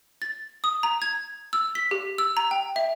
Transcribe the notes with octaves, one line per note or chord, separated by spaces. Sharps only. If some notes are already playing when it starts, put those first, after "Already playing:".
A6
D#6
A#5
G#6
E6
B6
G4
E6
A#5
G5
E5